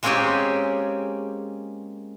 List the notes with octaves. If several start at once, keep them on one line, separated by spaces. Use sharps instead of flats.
G#3 A#3 C4 C#4 G4 G#4